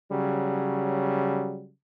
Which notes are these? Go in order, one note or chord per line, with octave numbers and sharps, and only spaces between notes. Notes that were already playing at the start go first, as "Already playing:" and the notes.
C#3 F#3 G3